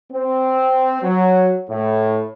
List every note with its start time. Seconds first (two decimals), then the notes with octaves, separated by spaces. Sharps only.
0.11 C4
1.03 F#3
1.69 A2